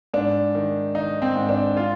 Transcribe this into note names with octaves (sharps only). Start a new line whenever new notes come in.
G#2 D4
D#3
D#3 D#4
C4
G#2
D4
F4